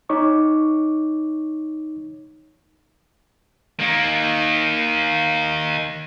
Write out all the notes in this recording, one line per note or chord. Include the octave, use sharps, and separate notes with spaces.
D#4 C#5 C#6 D6
D#3 A#3